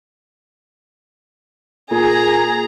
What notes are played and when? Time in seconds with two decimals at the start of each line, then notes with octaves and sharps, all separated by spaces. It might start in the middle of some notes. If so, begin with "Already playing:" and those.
1.91 A#2 G#4 A#5